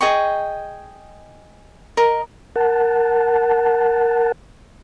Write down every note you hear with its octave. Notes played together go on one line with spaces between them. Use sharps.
G#4 D#5 G5 C#6
A#4 D#5
A#4 F#5 A5